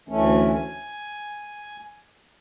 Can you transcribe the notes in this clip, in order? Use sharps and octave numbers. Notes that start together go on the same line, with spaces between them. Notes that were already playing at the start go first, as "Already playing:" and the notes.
D2 E3 A3 C#4
G#5